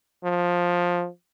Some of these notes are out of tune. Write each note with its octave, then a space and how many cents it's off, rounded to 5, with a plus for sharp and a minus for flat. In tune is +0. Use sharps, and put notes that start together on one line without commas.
F3 +15